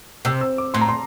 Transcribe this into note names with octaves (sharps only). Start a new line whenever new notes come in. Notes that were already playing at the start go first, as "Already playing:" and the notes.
C3 E6
E6
D6
A2 C6
A#5
C6